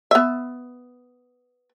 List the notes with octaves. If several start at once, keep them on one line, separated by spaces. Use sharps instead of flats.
B3 E5